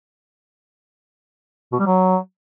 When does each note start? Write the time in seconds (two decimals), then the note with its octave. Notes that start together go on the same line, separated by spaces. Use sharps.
1.73 B2
1.80 G3
1.87 F#3